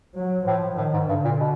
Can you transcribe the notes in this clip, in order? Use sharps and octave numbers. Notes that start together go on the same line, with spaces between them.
F#3
A2 F3
A2 D#3
G#2
G2 D3
A#2
B2